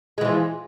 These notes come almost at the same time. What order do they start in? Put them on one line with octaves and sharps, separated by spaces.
G#3 E3 F3